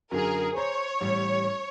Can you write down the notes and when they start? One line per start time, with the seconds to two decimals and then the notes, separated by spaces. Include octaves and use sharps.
0.11 F#2 D3 G#4 A#4
0.57 C5 C#5 A#5
1.01 A1 G3